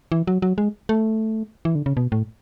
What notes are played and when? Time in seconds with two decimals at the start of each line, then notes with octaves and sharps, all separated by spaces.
0.12 E3
0.27 F#3
0.42 F#3
0.58 G#3
0.89 A3
1.65 E3
1.75 D3
1.86 C#3
1.97 B2
2.12 A2